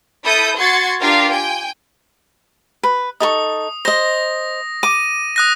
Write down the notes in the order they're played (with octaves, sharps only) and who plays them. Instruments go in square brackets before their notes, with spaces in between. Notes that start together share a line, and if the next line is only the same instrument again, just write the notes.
[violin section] E4 A4 D#6 G6
F#4 C6 G#6 A6 C#7
D4 F4 G4 A#4 F5
G5 G#5
[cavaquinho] B4
[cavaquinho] D#4 A4 C#6 [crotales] D#6
[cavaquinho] C5 D#5 [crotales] A#6
[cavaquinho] D6 [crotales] D#7
[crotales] D#6 F#6 A#6